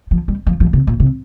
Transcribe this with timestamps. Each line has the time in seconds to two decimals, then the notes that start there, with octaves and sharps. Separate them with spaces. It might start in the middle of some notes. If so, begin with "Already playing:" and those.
0.11 F3
0.28 G3
0.47 F3
0.60 F3
0.73 C3
0.87 A#2
1.00 C3